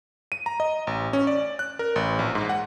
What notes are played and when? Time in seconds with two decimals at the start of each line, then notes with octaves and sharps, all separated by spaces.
0.32 D#7
0.46 A#5
0.60 D#5
0.87 A1
1.13 C#4
1.27 D5
1.59 F#6
1.79 A#4
1.96 A1
2.19 A#1
2.35 G#2
2.49 F#5